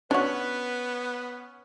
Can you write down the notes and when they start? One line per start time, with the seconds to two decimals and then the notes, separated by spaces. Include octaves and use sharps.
0.11 B3 C#4 D4 F#4 B4 C#5